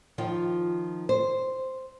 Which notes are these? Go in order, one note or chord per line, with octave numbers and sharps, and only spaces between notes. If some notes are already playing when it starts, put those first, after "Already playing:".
D#3 F3 F4
C5